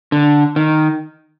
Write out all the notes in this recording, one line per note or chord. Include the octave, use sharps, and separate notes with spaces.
D3
D#3